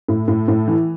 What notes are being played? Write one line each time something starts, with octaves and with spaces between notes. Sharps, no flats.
A2
A2
A2
E3